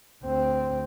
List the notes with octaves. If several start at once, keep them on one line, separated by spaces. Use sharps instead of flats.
D2 C4